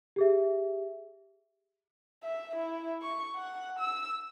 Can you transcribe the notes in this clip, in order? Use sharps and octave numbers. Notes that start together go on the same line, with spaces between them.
G4 G#4 E5
E5
E4
C#6
F#5
E6